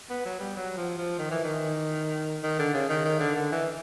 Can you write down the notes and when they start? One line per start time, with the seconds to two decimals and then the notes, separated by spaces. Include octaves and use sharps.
0.10 B3
0.25 F#3
0.40 G3
0.57 F#3
0.77 F3
0.98 F3
1.18 D#3
1.31 E3
1.44 D#3
2.43 D#3
2.59 D3
2.74 C#3
2.89 D#3
3.05 D#3
3.20 D3
3.36 D3
3.52 E3